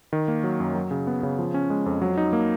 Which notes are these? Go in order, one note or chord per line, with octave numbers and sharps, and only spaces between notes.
D#3
A#3
F#3
F#2
F#3
C#3
B3
C#3
F3
C#4
G#3
F2
F#3
D#4
A#3